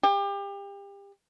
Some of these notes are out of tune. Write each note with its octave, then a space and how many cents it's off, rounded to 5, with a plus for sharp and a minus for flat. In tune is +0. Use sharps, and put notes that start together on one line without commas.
G4 +30